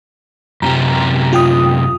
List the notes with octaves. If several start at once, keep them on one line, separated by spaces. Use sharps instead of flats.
F#2 C3 G4 A#5
F4 G5 D#6